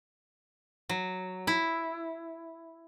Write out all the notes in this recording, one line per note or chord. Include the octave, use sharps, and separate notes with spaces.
F#3
E4